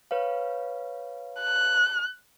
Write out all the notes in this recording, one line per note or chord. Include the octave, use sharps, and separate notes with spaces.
B4 C#5 F5
F#6